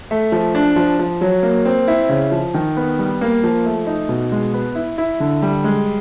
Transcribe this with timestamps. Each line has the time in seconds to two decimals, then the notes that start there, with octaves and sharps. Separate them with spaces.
0.11 A3
0.32 F3
0.55 D4
0.76 F3
0.99 F3
1.21 F#3
1.43 A#3
1.65 C4
1.88 E4
2.09 C#3
2.32 F3
2.54 D#3
2.77 B3
2.99 G3
3.21 A#3
3.43 F3
3.66 A3
3.87 D#4
4.09 B2
4.32 G#3
4.54 B3
4.75 E4
4.98 E4
5.20 D3
5.42 G3
5.64 G#3